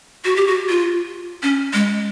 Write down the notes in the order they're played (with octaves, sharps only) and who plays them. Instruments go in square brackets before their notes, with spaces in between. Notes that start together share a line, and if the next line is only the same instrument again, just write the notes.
[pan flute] F#4
G4
F#4
F4
C#4
G#3